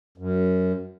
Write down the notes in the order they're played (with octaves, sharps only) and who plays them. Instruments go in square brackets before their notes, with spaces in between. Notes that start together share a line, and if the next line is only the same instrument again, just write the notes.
[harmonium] F#2